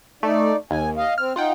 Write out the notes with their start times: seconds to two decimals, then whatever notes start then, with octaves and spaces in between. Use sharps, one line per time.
0.23 A3 D#4 D5
0.71 D#2 G#5
0.97 D#5 F5
1.18 C4 F6
1.36 D#4 F4 F#5 G5